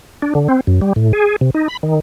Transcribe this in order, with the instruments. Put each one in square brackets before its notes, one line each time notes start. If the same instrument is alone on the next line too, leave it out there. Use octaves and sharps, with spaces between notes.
[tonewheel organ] D4
D3
C4
F#2
G3
A2
G#4
C3
D#4
B5
D#3